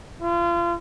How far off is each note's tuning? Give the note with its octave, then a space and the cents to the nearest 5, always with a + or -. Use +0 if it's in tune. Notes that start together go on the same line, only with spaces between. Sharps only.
F4 -35